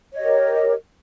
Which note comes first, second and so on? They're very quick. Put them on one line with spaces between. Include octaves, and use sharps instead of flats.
C#5 D#5 G4 A#4